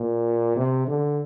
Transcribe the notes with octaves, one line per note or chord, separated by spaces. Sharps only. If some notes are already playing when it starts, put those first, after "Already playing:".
Already playing: A#2
C3
D3